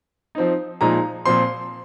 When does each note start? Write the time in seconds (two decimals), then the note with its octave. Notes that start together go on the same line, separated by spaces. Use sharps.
0.35 F3 C4 D#4
0.81 A#2 F3 G#3 D#4 A#5
1.25 A#2 F3 C4 C6